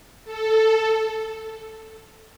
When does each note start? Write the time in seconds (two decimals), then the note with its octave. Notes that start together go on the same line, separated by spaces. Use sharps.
0.25 A4